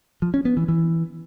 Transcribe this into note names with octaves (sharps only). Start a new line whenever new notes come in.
F3
C#4
B3
E3
E3